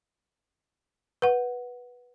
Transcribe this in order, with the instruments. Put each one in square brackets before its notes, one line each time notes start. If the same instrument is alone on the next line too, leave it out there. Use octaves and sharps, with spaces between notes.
[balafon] B4 F#5